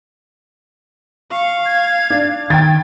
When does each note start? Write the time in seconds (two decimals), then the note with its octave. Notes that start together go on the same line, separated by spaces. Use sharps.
1.32 F5 C#6
1.65 G#6
2.10 D4
2.50 D#3 G5 G#6 A6